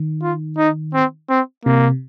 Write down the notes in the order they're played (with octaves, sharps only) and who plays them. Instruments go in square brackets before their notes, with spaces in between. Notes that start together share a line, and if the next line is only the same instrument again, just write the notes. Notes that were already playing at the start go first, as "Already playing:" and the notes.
Already playing: [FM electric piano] D#3
[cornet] F4
D#4
C4
C4
[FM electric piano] C3 [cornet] A#3